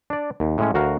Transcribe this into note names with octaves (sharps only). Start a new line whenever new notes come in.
D4 D5
D#2
A2 G#3 C#4
D2 F#4 A#4 F5